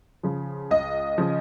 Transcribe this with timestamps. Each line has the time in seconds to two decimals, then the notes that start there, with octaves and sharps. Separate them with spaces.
0.23 C#3 F3
0.71 C#2 D#5
1.18 C#3 F3